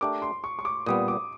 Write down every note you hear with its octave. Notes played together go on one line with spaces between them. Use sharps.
A3 D4 G4 A#4 D6
C6
C#6
C#6
D6
A#2 G3 B3 D#6
D6